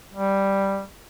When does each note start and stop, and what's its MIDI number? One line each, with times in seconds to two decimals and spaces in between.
0.14 0.83 55